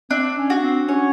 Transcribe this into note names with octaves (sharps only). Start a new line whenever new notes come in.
C4 D4
C#4
F#4
C4
C#4 C#5